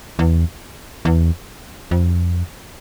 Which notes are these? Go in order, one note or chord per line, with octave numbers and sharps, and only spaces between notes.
E2
E2
F2